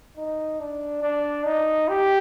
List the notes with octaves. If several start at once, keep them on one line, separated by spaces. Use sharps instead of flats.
D#4
D4
D4
D#4
G4